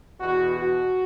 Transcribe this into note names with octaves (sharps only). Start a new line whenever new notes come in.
E2 B2 F#4
F#4